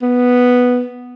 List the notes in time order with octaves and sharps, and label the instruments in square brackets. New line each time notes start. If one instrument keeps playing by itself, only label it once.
[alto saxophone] B3